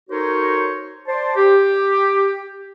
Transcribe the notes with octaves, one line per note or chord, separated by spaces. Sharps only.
D#4 F#4 A4 A#4 C5 C#5
C5 D5 A5 C6
G4